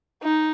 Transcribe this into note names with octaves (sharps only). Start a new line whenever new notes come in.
D#4